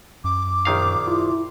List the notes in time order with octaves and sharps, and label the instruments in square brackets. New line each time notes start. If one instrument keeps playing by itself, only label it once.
[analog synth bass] F#2 [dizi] D6
[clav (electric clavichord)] A#1 D#3 F5
[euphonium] E4 [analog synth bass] F4